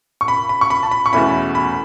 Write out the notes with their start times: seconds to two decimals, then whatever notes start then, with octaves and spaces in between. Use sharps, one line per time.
0.21 C#6
0.28 B5
0.49 B5
0.61 C#6
0.70 B5
0.83 A5
0.91 B5
1.06 C#6
1.12 E2 B2 A3 C#4 E4 B5
1.55 B5